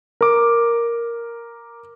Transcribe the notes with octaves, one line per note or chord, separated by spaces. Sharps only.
A#4 D6